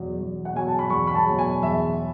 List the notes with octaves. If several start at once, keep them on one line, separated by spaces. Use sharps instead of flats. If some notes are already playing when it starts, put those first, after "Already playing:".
Already playing: E2 B2 F#3
E2
F#5
B2 F#3 G#5
A5
B5
E2 C#6
B5
A5
B2 F#3
G#5
E2 E5